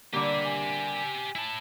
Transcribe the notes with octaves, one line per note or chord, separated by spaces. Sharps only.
D3 G3 A#3 G4 E5
G#5
E4 A5